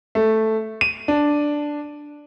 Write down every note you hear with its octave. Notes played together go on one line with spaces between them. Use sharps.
A3
D#7
D4